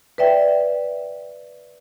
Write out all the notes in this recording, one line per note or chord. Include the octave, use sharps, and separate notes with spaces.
B4 D5 E5 G5